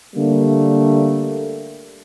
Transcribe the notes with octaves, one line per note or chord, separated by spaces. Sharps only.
D3 G3 A3 A#3